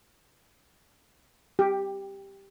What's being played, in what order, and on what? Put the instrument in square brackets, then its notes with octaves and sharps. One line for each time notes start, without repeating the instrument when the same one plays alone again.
[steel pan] G4